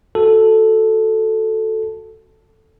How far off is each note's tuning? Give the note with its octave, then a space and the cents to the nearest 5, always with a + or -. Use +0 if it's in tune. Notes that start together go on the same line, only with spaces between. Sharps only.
F#4 -10 A4 +0